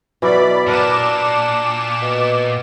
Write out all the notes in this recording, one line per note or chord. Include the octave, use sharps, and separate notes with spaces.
B2 E3 F#3 E4 D5 B5
A#2 D4 A#4 F#5 D6 E7
B2